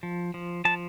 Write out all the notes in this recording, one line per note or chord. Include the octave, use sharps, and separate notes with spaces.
F3
F3
F3 A5